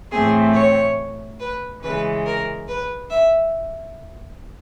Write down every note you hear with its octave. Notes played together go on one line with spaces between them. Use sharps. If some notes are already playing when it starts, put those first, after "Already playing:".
A2 E3 A3 C4 G#4
C#5
B4
C#3 E3 G#3 B4
A#4
B4
E5